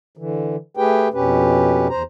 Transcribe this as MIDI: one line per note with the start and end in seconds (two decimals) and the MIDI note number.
0.17 0.56 50
0.17 0.56 52
0.77 1.08 57
0.77 1.08 67
0.77 1.08 68
0.77 1.08 71
0.77 1.08 79
1.13 1.87 41
1.13 1.87 47
1.13 1.87 61
1.13 1.87 67
1.13 1.87 71
1.90 2.03 40
1.90 2.03 72
1.90 2.03 82